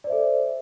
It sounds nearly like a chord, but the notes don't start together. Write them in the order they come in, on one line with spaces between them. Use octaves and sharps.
D5 C5 E5 A4